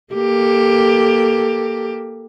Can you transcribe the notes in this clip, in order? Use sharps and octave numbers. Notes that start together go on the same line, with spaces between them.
A#3 G4 A4